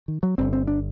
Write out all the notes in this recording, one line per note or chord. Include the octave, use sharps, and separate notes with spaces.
D#3
F#3
G1 G2 D3 C4
C4
D4